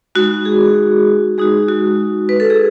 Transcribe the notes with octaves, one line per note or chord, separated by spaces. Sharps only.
G#3 D#4 F#4
G#4
G#3 D#4 F#4 G#4
F#4
B4
A4
G#4